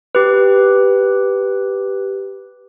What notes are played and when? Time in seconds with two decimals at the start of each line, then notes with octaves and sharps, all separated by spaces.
0.15 G4 B4